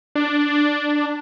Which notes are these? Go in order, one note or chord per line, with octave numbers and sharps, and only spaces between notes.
D4